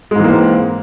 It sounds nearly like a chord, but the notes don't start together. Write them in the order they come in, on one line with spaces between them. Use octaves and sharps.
G#3 G#2 E3 A#3 C4